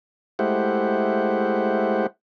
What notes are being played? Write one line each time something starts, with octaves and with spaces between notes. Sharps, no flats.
G#3 A3 E4 G4 C5 F#5